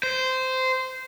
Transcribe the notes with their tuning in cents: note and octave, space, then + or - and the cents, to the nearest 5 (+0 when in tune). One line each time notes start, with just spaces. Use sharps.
C5 -15